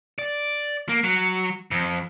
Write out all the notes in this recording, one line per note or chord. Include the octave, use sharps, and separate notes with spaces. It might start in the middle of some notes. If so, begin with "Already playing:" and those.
D5
A#3
F#3
F2